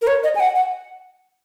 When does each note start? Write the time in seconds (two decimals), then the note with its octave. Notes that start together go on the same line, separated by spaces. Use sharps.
0.02 A#4
0.07 C#5
0.23 D#5
0.35 G#5
0.40 F#5
0.55 F#5